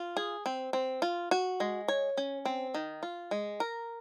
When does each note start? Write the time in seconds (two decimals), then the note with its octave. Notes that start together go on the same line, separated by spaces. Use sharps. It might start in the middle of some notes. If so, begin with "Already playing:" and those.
Already playing: F4
0.17 G#4
0.46 C4
0.73 C4
1.02 F4
1.31 F#4
1.60 G#3
1.88 C#5
2.17 C#4
2.45 C4
2.75 D#3
3.03 F4
3.31 G#3
3.60 A#4